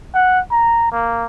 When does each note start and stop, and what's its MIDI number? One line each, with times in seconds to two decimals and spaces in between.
0.14 0.40 78
0.51 0.89 82
0.92 1.25 58